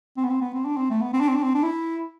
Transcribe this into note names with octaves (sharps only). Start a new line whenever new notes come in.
C4
B3
C4
B3
C4
D4
C4
A3
B3
C4
D4
C4
D4
C4
D4
E4